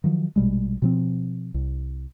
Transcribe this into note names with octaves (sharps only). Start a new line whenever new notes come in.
D#3 F3 F#3
A#1 B2 G3 G#3
B2 F3 C4
C2